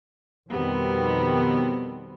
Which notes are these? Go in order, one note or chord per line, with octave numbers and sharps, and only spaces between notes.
F2 B2 D#3 G3 B3 C4